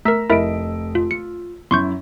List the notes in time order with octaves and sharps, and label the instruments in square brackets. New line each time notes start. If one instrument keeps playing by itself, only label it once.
[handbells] A3 A#4 [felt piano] A#5 E6 B6
[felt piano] F1 D#5 D7 [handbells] E4 A#4 E5
[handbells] F4
[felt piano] F4 [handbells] C#7
[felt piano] F#2 E4 [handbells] C6 C#6 G6